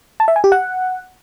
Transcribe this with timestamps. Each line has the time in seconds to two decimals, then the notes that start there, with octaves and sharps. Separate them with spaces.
0.20 A5
0.28 E5
0.36 G#5
0.44 G4
0.52 F#5